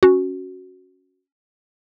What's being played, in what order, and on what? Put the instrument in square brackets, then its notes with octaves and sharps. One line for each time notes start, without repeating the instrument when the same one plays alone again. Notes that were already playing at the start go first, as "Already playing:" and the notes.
[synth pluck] C#4 F#4